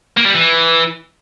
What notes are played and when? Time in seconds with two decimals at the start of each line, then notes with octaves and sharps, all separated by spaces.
0.17 A#3
0.26 G3
0.35 E3